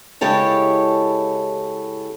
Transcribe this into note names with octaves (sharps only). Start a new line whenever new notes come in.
C#3 G#3 E4 G4 A4 C#5